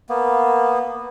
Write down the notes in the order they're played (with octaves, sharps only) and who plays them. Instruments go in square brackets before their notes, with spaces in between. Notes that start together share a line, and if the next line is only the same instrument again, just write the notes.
[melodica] A#3 B3